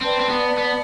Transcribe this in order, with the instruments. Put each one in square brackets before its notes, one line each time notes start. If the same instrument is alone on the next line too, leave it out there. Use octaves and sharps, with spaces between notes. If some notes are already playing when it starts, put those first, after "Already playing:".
[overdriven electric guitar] C4 [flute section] B4 D5 A5
[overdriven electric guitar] C4
B3
B3